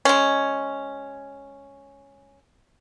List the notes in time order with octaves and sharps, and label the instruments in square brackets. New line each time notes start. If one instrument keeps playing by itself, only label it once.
[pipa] G#3 C#4